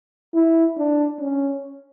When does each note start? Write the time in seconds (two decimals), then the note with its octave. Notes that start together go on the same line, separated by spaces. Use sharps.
0.34 E4
0.78 D4
1.21 C#4